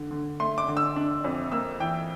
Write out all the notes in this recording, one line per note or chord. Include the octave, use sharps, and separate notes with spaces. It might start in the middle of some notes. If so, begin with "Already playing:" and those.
Already playing: D3
D3
A3 C6
D6
D3
E6
D4
F2
A#3 E6
E3 G5